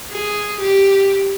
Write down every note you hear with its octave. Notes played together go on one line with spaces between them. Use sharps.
G#4
G4